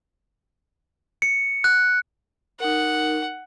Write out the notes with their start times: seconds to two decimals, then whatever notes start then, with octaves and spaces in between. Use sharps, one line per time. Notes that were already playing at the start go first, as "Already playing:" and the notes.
1.22 C#7
1.64 F#6
2.60 D#4 A#4 F#5